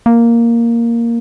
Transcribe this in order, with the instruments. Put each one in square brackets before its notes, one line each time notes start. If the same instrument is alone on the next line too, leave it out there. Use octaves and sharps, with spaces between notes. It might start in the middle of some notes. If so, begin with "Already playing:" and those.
[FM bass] A#3